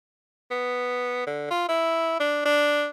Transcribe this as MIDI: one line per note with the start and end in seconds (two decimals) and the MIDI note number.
0.51 1.23 59
1.27 1.47 50
1.51 1.67 65
1.69 2.16 64
2.20 2.44 62
2.45 2.87 62